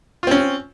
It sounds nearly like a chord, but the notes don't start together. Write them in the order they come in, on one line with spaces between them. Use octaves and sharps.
F4 C4 C#4